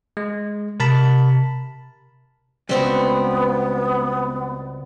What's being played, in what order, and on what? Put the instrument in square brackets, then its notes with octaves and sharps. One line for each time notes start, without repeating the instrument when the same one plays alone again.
[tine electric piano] G#3
[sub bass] C3 [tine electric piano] A#4 A5 B5
[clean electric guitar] C#2 [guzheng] G3 C4 F#4 [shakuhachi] B3